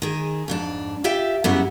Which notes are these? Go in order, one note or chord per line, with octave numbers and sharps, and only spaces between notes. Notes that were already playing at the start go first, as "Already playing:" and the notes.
D#3 G#4
F2 G#2 D4
F4 G4 E5 G5
F#2 C#3 G3 B3 E4 F#4